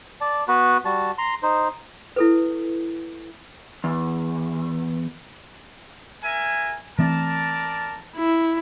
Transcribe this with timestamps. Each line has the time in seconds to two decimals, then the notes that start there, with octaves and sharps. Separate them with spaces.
0.21 D5 A5
0.48 B3 F#4 B4
0.85 G3 F#4 A5
1.18 A#5 C6
1.43 D#4 C5
2.16 E4 A4 B4
3.84 E2
6.24 A#4 E5 G#5
6.99 E3 A3 C4 A#4 D5 A5
8.16 E4